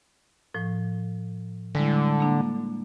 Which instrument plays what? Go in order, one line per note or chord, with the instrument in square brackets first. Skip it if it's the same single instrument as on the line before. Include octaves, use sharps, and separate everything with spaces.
[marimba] A2 F3
[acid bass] D3 [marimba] G3 G#3 E4
[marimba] A#3 D4